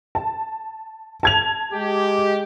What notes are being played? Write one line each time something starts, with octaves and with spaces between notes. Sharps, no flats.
A5
A5 G#6 F7
G#3 G4